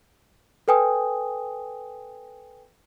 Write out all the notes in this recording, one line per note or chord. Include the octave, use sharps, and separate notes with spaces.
A4 B4 G5 G#5 D#6